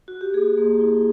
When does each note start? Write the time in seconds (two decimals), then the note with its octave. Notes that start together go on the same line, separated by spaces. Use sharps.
0.08 F#4
0.21 G4
0.34 A#3 G#4
0.57 A#3
0.80 E4